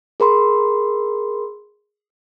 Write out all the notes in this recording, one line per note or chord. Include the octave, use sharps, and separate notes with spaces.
G#4 A#4 B5 C6